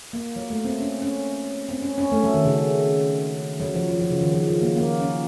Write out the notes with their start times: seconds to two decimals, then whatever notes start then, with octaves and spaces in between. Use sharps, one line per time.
0.13 A#3
0.36 F#3
0.50 A3
0.65 C4
0.80 C#4
1.02 C#4
1.69 C4
1.82 C#4
1.98 C#4
2.12 A3
2.24 F#3
2.34 D#3
2.45 C#3
3.60 F#3
3.74 F3
3.89 F#3
3.99 F3
4.10 C#3
4.21 D#3
4.32 F3
4.48 F#3
4.62 A#3
4.76 A#3
4.99 C#4